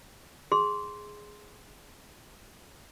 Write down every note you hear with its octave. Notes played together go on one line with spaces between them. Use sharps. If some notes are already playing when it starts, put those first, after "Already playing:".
G#4 C6